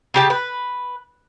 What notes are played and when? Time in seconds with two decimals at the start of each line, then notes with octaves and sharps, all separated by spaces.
0.14 C#3 G4 A5
0.30 B4